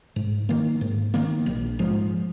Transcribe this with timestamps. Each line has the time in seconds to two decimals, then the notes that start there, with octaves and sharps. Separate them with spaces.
0.16 G#2
0.49 D#3 A#3
0.81 G#2
1.14 D#3 A#3
1.46 A#1
1.79 G#2 F3